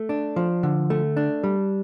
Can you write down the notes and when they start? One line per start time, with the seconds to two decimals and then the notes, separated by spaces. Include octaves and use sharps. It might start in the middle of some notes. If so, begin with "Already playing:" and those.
Already playing: A3
0.09 D4
0.36 F3
0.63 D3
0.90 A3
1.17 D4
1.44 G3